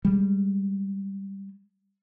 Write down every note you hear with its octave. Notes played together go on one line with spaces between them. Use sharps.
G3 G#3